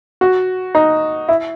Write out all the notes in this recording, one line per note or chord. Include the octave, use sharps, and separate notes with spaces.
F#4
D#4
E4